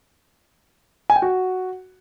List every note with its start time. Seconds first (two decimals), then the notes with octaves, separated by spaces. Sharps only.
1.10 G#5
1.16 G5
1.22 F#4